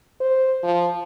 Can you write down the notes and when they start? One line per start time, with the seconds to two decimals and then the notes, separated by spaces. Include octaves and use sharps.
0.21 C5
0.63 F3